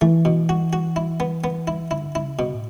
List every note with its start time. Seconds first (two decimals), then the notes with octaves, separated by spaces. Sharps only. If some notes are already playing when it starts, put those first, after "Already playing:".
0.01 E3 A3
0.25 B2
0.49 F#4
0.73 F#4
0.96 E4
1.20 B3
1.44 B3
1.68 E4
1.91 D3 E4
2.15 E4
2.23 C#3
2.39 B2
2.54 A2